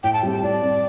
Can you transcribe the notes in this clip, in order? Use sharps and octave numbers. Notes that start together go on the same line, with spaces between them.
A2 G5
A5
G3 C4 G4
A5
A2 D5
G3 C4 G4